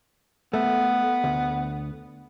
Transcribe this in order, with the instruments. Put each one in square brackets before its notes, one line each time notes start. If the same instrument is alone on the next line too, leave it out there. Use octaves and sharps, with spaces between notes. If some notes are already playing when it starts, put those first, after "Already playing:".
[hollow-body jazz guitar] A3 [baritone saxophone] B3
[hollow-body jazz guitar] D2